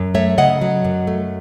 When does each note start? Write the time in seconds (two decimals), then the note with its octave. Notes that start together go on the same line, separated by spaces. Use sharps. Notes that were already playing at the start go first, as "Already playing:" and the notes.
Already playing: F#2
0.15 A3 C#5 E5
0.38 C#3 D#5 F#5
0.61 F#3
0.84 F#2
1.07 A3